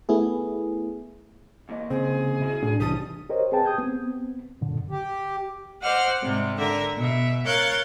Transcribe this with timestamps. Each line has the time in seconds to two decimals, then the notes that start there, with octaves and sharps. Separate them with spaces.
0.09 A3 B3 E4 G#4
1.69 E2 A#3 D#5
1.90 C#3 C4 G#4
2.41 E4 F#4
2.63 A2 D4
2.80 C2 E3 G4 A5 D#6
3.29 G4 A#4 C5 C#5 D#5
3.52 C4 G#4 B4 G5 A5
3.65 G4 D#6 G6 G#6
3.78 B3 C4
4.61 F#2 A#2 D3
4.91 G4
5.82 C5 D#5 F#5 D6 F6
6.22 G#2 C3 G3
6.58 D3 A#4 E5
6.95 B2 E5
7.44 A#4 C#5 F5 F#6 G6 A6